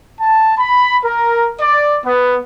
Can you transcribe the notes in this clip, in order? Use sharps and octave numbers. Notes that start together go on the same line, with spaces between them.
A5
B5
A#4
D5
B3